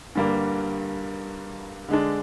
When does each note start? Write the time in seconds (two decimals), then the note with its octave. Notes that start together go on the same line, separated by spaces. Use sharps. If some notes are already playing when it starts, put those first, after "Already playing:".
0.15 G2 D3 G3 A#3
1.89 D3 G#3 D4